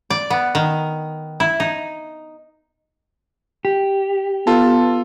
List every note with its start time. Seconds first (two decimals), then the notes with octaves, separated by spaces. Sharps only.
0.10 D5
0.30 B3
0.55 D#3
1.40 E4
1.60 D#4
3.65 G4
4.47 B3 F4 A4 A5